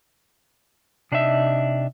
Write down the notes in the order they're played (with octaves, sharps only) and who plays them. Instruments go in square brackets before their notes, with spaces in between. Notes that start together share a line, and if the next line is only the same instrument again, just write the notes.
[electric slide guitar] C3 D4 D#4 D#5 E5